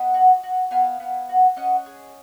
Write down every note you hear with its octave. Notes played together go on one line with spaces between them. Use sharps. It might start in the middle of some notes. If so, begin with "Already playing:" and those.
Already playing: B3 D#5 F#5
F#4
F#4
B3 F5 G#5
B3
F#4
C#4 D#5 F#5
G#4